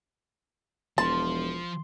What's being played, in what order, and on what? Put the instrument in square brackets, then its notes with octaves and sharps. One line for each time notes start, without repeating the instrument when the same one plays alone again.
[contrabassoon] E1 [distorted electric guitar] F3 [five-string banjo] A5 [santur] C6